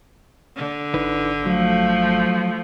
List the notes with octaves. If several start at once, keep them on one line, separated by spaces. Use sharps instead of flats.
D3
G#1 D#4 E4 B4
F3 F#3 A3